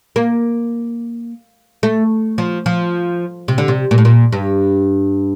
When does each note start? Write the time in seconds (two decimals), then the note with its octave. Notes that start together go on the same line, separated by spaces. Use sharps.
0.16 A#3
1.83 A3
2.38 F3
2.66 F3
3.48 C3
3.58 D3
3.68 C3
3.91 A#2
3.98 A2
4.05 A#2
4.33 G2